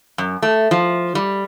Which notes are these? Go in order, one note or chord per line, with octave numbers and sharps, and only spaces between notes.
F#2
A3
F3
G3